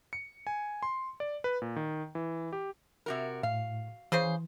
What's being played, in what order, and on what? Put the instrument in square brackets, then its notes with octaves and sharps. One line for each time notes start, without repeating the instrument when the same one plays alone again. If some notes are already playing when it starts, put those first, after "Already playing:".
[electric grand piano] C#7
G#5
C6
D5
B4
A#2
D#3
E3
G4
[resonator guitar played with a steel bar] C3 F#4 A#4
[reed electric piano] A2 [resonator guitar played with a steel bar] F5
[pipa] C#3 G#4 C5 [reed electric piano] E3